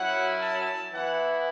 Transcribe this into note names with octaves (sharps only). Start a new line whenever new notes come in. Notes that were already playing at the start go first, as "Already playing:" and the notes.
Already playing: F#2 F#3 C#4 E4 F#5
A5
E3 B3 E4 F#5